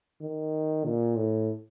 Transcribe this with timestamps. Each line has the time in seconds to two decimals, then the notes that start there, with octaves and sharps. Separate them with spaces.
0.21 D#3
0.85 A#2
1.16 A2